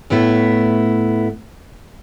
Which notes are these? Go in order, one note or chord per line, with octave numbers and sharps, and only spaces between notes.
A2 A3 B3 E4